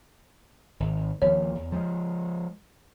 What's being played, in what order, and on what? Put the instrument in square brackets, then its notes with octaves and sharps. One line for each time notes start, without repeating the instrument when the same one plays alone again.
[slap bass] G#1
[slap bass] D#2 F3 A#3 [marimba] C#5
[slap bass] E2
F3 G3 G#3